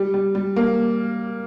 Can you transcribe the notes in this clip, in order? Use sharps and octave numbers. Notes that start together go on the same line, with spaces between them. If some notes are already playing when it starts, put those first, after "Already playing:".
Already playing: G3
G3
G3
A#3